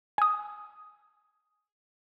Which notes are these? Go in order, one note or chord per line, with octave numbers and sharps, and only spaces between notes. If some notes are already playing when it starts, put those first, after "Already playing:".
G#5 D#6